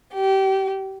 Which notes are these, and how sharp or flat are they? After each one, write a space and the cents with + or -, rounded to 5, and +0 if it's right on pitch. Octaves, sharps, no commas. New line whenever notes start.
G4 -25